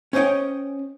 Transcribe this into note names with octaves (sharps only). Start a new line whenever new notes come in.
C#4 C5 C#5 D#5 G5